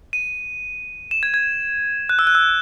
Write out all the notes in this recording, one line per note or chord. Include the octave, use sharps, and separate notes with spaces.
D#7
E7
G#6
G#6
F#6
E6
F#6
E6